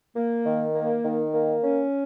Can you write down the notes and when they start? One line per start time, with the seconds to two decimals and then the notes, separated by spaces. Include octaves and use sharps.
0.16 A#3
0.46 D#3
0.75 A#3
1.05 D#3
1.34 A#3
1.63 C#4